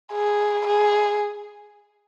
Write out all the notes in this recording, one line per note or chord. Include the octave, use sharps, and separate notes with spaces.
G#4
G#4